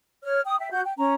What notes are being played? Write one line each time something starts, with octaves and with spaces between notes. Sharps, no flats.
C#5 F6
G5 D#6
E5 G5
F#4 G6
G5
C#4 A#5